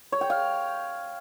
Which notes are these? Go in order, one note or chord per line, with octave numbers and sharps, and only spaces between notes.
C#5
G5
F5